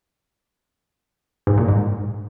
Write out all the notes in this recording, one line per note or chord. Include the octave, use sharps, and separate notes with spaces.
G#2
A#2
G#2